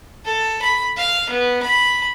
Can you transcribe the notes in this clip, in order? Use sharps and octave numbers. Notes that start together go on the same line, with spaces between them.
A4
B5
F5
B3
B5